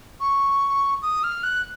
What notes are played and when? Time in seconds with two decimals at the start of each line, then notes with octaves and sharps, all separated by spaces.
0.20 C#6
1.02 D#6
1.24 F6
1.43 F#6